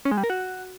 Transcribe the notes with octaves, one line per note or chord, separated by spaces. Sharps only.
C#4
G#3
G3
A#4
F#4